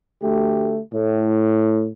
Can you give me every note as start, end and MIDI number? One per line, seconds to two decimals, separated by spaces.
0.23 0.80 38
0.23 0.80 57
0.23 0.80 67
0.94 1.88 45